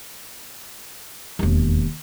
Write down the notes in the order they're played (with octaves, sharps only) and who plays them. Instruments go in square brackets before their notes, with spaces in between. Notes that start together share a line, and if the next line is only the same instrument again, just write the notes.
[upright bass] E1 D#2